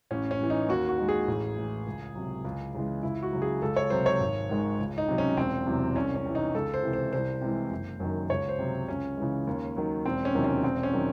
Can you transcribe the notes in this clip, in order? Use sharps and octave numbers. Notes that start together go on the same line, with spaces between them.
A1 C#4
C#4
A2 E3
D#4
D#2 F#4
F#4
D#3 G#3
G#4
A1
A2 E3
C#2
C3 F#3
C#2
C#3 E3 G#3
C#2 E4
F#4
C#3 F#3
G#4
C#2 A4
C#5
C3 F#3 C5
C#5
G#1
G#2 D#3 G#3
C#2
D#4
C3 F#3
C#4
E1 C4
E2 C3 F#3
C2 C#4
C#4
C3 E3
D#4
C#2 A4
C5
C3 E3
C5
C2 C5
C3 E3 G#3
F#1
F#2 D#3 F#3
C#2 C#5
C5
C3 F#3
C#2 C#4
C#3 E3 G#3
D#2
D#3 F#3
E1 C4
C#4
E2 C3 D#3 F#3
C#4
E1 C4
C#4
D#3 F#3